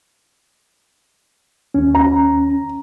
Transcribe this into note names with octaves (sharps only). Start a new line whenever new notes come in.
D#2 C#4
A#5